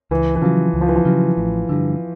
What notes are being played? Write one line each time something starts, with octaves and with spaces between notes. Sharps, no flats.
C#2 E3
E3
C#3 F3 F#3
C#2
F3
E3
F3
C#3 F#3
A1
G2 D3